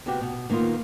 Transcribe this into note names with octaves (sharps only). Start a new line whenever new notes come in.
C3 B3 F#4 G4
B2
D#3 A#3 B3 D#4 F4